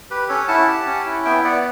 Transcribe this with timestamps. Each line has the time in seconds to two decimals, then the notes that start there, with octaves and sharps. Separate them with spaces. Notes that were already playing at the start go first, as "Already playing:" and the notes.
0.11 G4 B4
0.29 C#4 A4 C#5
0.48 E4 F#5 A5
0.68 G4
0.87 C#4
1.06 E4
1.25 B3 E5 G5
1.44 B3 D5 F#5